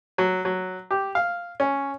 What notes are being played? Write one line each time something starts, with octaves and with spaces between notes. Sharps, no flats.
F#3
F#3
G4
F5
C#4